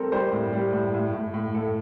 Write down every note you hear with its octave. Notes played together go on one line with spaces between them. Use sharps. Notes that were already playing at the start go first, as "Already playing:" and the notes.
Already playing: G3 C4 A4 A#4
G3 C5
A2
G3
A2
A2
A2
A2
A2 A4